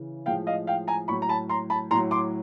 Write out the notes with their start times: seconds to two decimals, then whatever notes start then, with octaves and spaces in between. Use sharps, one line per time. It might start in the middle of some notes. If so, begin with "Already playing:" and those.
Already playing: C#3 E3
0.26 A2 F3 G#3 F5 G5
0.47 D#5 F5
0.67 F5 G5
0.88 G#5 A#5
1.08 A2 F#3 B5 C#6
1.22 A#5
1.29 A5 B5
1.50 A#5 C6
1.70 A5 B5
1.91 A2 F#3 A#5 C6
2.11 C6 D6